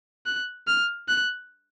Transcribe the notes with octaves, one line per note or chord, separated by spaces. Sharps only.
F#6
F6
F#6